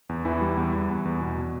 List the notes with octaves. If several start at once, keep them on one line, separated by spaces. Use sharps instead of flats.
E2
E2 E3 E4
G3
E2
E2
E2
E2
B2
B2